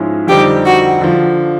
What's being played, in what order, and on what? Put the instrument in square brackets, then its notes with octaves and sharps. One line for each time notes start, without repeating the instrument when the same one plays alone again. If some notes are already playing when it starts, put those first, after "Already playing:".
Already playing: [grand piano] G#2 F3 G#3 C#4 E4
[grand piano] F2 D3 G3 C4 D#4 [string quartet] G4
[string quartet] F#4
[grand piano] D3 F3